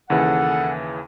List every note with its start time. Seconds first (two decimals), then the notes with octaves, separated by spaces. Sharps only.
0.10 D#2 C#3 E3 G#4 A4 F#5